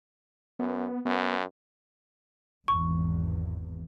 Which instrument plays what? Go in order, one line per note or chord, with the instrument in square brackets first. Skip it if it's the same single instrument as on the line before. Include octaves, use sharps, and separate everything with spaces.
[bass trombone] F#2 [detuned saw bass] B3
[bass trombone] F#2 [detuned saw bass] B3
[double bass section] G#1 E2 [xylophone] C#6